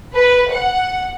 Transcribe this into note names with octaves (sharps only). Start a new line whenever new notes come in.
B4
F#5